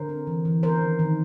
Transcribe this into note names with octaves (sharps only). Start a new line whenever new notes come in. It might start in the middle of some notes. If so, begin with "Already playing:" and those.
Already playing: D3 A#4 C5
C4
E3
E3
B3 A#4 C5
D#3
D#3